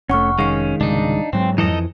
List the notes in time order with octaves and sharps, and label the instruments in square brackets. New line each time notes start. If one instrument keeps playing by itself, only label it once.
[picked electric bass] F1 [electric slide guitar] A3 C#4 [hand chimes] F#5 C#6 F6
[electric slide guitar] D#3 G#3 [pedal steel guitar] C#4 [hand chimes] F5 C7
[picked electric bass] C2 G#2 C#3 [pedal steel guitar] D4 D#4
[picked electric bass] G#2 F#3 G#3 [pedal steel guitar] C4
[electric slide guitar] F2 E3 [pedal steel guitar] D#4 A4 D#5